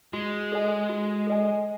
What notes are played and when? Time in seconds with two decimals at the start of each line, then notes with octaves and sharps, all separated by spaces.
0.13 G#3 F#4
0.52 A4 D#5 G#5
0.89 F#4
1.27 A4 D#5 G#5